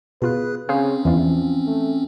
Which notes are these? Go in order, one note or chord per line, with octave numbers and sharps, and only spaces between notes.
B2 F4 G#4 B4 F#6
C#3 C4 C#4 G#4 C5 F5
E2 E3 F3 F4
A3